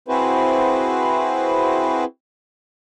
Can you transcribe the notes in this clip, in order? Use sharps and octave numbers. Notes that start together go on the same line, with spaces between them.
C4 E4 F#4 G#4 B4 C5